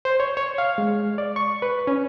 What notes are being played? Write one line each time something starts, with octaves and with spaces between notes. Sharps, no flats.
C5
C#5
C#5
F5
G#3
D5
C#6
B4
C#4